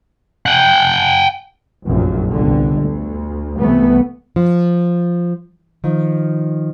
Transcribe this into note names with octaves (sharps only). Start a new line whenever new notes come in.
F#5 G5
F1 A#1 F#2 A#2
G1 C2 D3
D2
C2 E3 A3 B3
F3
D#3 F3